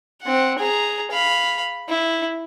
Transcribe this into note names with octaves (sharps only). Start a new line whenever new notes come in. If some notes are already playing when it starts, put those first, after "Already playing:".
C4 F#5
G#4 A#5
F5 B5
E4